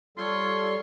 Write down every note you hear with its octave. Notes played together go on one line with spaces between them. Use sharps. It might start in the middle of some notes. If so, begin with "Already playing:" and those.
G3 F4 A4 C#5 C6